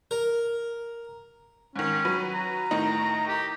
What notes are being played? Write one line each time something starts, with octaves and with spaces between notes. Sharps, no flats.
A#4
G#2 D#3 C#4
F#3 B4
A#5
A2 D#3 D#4
G4